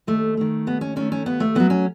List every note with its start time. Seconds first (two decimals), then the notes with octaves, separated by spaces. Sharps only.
0.07 D#2 A3
0.37 D#3 A3
0.67 D#2 B3
0.81 C#4
0.96 D#3 A3 C#4
1.12 C#4
1.26 D#2 B3
1.40 A3
1.55 D#3 F#3 B3
1.70 C#4